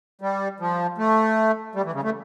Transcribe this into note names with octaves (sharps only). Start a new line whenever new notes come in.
G3
F3
A3
G3
E3
C#3
A3